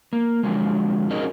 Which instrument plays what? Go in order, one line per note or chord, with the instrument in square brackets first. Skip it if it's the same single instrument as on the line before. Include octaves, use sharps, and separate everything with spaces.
[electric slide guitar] A#3
D3 F3 F#3 G#3
C#4 D#4 F#4 G#4 A#4 D#5